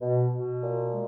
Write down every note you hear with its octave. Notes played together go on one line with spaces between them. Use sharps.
B2
B2
A#2
G#3